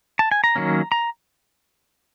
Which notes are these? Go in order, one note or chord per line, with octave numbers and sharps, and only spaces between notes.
A5
G#5
A#5
D#3 F#3 A#3 C#4
A#5